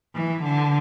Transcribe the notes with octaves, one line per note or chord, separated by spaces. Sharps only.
E3
D3